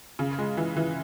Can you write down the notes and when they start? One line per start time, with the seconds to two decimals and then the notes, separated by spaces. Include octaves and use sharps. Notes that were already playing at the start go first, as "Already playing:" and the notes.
0.19 C#3
0.38 G#3
0.57 E3
0.76 E3